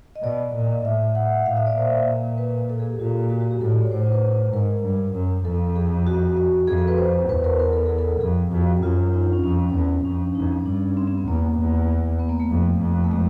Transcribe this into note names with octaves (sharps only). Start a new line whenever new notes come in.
D#5
B2 D5
A#2
A2 E5
F#5
A2 F5
E5
D5
A#2 C5
B4
A4
G#4
G4
A#2 F4
F#4
F#4
G4
A2 A4
D5
C#5
A2 C5
C5
B4
G#2 A#4
G2
F#2
F2 A4
G#4
F#4
F#4
F2 G#4
A4
B4
C5
E2 B4
A#4
A#4
A4
G#4
A4
F2 G#4
F2 F#4
F#2 F4
D#4
D4
C#4
F2 C#4
C#4
E2 C4
F2 C#4
D4
F2 D#4
C#4
G2 D4
C4
C4
B3
E2 A#3
E2
B3
A#3
A3
F2
F2
A3
G#3